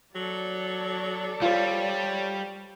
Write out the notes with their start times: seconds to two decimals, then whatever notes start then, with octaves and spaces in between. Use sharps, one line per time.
0.16 F#3 A4 D5
1.42 G3 F4 C5 C#5